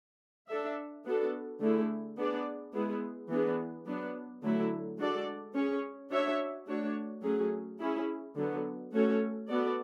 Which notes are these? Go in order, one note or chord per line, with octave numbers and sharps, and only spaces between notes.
D4 A4 E5
B3 D4 F#4 A4
D3 A3 E4 G#4
B3 D4 G#4 D5
G#3 B3 E4 G#4
E3 B3 D4 G#4
F#3 B3 D4
D3 F#3 A3 E4
G#3 D4 F#4 A4 D5
C#4 G#4 C#5
D4 F#4 C#5 E5
A3 D4 F#4 C#5
F#3 A3 C#4 G#4
C#4 E4 G#4
D3 F#3 B3
A3 C#4 F#4 A4 C#5
B3 F#4 A4 D5